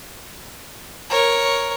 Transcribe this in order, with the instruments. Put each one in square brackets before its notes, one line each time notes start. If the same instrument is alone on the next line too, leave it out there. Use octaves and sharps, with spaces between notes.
[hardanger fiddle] A#4 C#5